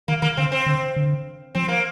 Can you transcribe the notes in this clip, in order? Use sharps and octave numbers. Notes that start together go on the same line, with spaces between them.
D#3 A#3
D#3 A#3
D3 C4
C4
D3
D3
F3 C4
A#3